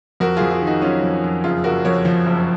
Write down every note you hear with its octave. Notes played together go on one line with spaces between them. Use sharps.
F2 F#4 A#4
F2 F4 G#4
F4 G#4
D#3
D#4 F#4
F#3 C#4 F4
F2
F2
F#1 F4 G#4
F#1 F#4 A#4
F2 A#4 C#5
F3
F#1